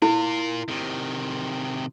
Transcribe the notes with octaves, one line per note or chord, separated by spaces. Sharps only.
E4 F4 A#4
C3 D#3